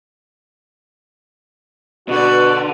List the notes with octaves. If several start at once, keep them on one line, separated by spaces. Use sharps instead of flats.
B2 D3 F#4 B4 D5